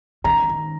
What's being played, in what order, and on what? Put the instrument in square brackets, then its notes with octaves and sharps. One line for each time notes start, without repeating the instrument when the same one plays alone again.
[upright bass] D#3 [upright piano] A#5
[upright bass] D#3